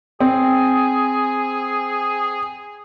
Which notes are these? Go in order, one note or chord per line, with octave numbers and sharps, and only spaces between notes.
C4 G#4